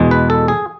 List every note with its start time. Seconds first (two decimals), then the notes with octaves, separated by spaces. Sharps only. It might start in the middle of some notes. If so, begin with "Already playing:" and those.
Already playing: E2 B2 G#3
0.11 B4
0.30 A4
0.48 G#4